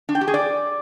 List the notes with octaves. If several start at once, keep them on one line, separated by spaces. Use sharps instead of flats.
D4
G5
G4
G#4
D5